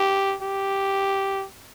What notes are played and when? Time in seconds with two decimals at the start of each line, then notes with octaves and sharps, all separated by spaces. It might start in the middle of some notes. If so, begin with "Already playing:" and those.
Already playing: G4
0.42 G4